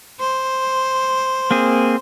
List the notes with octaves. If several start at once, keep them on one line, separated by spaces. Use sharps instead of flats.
C5
A#3 C4 G#4